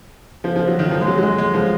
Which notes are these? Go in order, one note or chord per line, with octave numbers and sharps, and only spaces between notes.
F3
F3
F#3
D#3
F3
G#3
F#3
F#3
G#3
G#3
F3